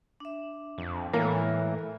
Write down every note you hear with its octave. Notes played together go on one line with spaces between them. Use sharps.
D4 E5
F2
A2 E3 G#3 A#3 A4 C#5